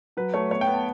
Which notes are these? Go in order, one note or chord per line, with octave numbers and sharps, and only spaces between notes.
F#3 B4
A3 C#5
B3 C#5
G5
B3
A5